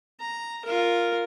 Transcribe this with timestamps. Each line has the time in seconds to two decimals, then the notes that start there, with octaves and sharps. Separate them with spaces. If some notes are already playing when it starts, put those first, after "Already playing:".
0.20 A#5
0.65 F4 A#4